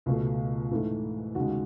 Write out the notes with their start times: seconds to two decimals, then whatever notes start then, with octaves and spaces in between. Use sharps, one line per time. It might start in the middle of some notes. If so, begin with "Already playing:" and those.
0.06 C#2 B2 A3
0.71 G#2 E3 A3
1.35 D#2 C#3 G#3 F#4